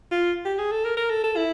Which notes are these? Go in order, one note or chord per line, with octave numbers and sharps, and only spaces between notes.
F4
G4
G#4
A4
A#4
A#4
A4
A4
E4